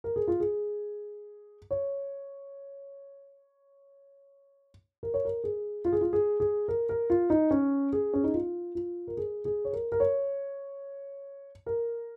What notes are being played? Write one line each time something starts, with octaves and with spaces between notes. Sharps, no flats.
A#4
G#4
F4
G#4
C#5
A#4
C#5
A#4
G#4
F4
G#4
F4
G#4
G#4
A#4
A#4
F4
D#4
C#4
G#4
C#4
D#4
F4
F4
A#4
G#4
G#4
C#5
A#4
A#4
C#5
A#4